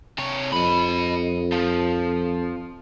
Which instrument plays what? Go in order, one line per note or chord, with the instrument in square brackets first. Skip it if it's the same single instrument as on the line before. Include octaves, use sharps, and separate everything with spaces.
[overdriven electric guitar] C3 C#5
[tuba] F2 [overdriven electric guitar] D#5 B5
[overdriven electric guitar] F3